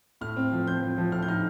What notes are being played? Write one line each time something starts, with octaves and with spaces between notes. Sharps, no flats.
A2 F6
C4
F3
C4 G6
F3
F3
A2 F6
G6
D#4 F6